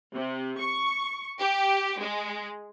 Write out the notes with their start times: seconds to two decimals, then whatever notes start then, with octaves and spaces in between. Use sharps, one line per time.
0.14 C3
0.60 C#6
1.40 G4
2.01 G#3